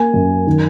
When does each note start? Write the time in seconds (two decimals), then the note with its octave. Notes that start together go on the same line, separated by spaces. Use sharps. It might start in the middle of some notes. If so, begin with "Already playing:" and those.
Already playing: A#3 G#5
0.14 F#2
0.47 D#3